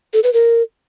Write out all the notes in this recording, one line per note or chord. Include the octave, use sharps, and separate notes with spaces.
A4
B4
A#4